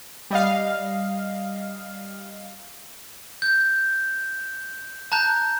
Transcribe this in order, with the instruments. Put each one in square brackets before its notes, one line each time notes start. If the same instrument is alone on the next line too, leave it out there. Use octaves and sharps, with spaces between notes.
[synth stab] G3 D#5 F5
[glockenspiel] G6
A5 A#5 F#6 G6